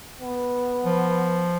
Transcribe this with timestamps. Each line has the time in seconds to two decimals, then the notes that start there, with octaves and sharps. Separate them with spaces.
0.20 B3
0.85 F3